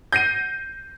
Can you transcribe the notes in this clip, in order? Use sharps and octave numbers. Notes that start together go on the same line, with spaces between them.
G6 A#6 C7 D#7